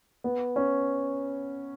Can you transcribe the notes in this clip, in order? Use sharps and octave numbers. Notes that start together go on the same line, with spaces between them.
B3
C#4